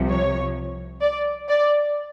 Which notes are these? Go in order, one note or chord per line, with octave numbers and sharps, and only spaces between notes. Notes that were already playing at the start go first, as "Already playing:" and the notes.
Already playing: C2 C3 F3
C#5
D5
D5